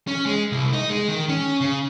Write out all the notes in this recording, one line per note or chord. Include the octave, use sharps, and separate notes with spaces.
C#4
G#3
C2
D#4
G#3
D#3
C#4
C#3